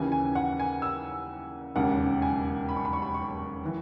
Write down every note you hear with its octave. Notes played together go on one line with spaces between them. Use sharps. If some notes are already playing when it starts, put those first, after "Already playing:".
Already playing: D#2 C#3 E3 G#5
G#5
F#5
G#5
E6
E1 D#2 C#3 F#5
G#5
B5
C#6
B5
C#6
B5
C#6
E3